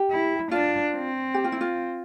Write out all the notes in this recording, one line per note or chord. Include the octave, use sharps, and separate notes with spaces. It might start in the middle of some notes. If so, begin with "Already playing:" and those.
Already playing: G4
E4
D4 F4
C4
G4
F4
E4
F4